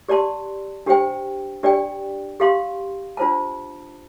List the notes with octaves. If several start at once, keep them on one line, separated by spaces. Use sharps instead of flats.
G4 D5 A5 C6
D4 G4 C5 G5
D4 G4 D5 G5
G4 F5 C6
D4 F4 C5 A5